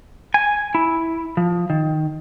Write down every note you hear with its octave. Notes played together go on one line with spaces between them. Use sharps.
G#5
E4
F3
D#3